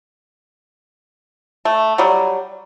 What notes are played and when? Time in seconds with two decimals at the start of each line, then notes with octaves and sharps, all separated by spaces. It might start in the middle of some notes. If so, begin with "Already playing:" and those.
1.65 A3
1.98 F#3 G3